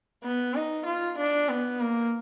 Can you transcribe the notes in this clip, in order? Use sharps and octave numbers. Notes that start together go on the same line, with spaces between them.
B3
D#4
F4
D4
B3
A#3